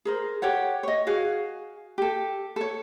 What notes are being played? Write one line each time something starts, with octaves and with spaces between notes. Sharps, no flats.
G#4 A#4 C5
G4 A4 C#5 F#5
C#5 D#5
F#4 G#4 F5
G4 A4
A4 C#5